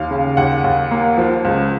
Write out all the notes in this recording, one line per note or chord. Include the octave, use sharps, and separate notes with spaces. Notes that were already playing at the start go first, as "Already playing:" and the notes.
Already playing: D#2 F5
C#3
D#2 F#5
D#2
A#3
F3
C#2